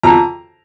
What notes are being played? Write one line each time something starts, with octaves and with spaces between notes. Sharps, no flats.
F2 A#5